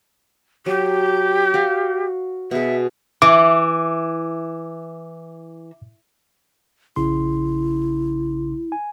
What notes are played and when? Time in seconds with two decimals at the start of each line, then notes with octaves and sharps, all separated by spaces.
0.66 F#3 G4
1.54 F#4 F5
2.51 B2 G#4 E5
3.22 E3 D6
6.96 A#1 C#3 E4 C6
8.72 G#5